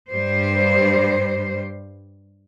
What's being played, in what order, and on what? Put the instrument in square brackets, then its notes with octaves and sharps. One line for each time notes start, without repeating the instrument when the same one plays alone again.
[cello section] G2 G3 C5